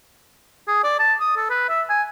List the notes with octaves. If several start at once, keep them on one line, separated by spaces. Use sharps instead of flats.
G#4
D5
A5
D#6
A4
B4
E5
G#5